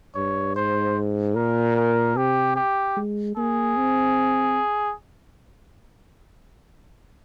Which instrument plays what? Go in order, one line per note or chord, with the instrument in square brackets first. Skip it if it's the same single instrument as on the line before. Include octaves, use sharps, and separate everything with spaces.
[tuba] G2 [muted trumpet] C#5
[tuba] G#2 [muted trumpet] C5
[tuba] A#2 [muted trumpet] A#4
[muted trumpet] A#4
[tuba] C3 [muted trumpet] G4
[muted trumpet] G4
[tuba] G#3
[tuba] A#3 [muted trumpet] G#4
[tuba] C4